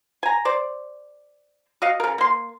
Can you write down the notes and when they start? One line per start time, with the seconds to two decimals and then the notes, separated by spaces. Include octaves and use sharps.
0.23 G#5 A#5
0.45 C5 D5
1.82 F#4 D#5 F5
2.00 C#3 A#4
2.18 A#3 C6